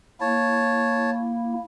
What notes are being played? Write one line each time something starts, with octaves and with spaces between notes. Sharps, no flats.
A#3 E4 C#5 A5